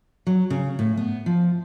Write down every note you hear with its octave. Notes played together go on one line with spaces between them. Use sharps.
F#3
C#3
A2
B3
F3